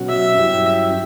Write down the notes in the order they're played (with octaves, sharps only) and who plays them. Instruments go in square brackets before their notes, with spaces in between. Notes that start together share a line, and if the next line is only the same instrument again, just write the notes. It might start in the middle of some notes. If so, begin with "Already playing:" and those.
Already playing: [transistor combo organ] B2 F#3 C#4 F#4
[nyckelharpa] E5
[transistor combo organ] G2 F#3 C#4 E4 G4